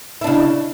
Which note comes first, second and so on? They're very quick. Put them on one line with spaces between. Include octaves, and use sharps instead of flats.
E4 D4 C#3